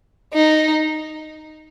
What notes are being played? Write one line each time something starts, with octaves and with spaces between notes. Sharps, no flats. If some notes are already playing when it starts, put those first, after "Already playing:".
D#4